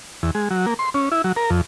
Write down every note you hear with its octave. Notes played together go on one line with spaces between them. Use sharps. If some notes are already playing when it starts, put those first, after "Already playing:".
E2
G#3
F#3
A#3
C6
C#4
E4
F#3
A#4
F2